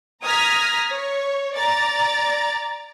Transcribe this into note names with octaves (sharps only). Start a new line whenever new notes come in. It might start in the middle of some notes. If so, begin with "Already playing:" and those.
A#5 D#6 F6 G#6 A#6 B6
C#5
D5 A#5 A6